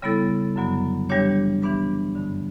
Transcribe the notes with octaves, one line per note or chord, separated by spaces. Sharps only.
C#3 G3 B3 E4 A4
F#2 D3 F#3 B3
E3 G3 D4 G4 C#5
E3 B3 D4 G4 B4
G2 D3 A3